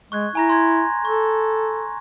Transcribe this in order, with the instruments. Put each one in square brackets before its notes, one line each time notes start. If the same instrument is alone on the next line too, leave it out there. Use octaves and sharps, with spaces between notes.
[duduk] G#3 [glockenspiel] C#6 F#6 G#6
[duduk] E4 [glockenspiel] G#5 A#5 A#6
[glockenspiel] C6 G#6
[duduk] A4 [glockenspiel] C#6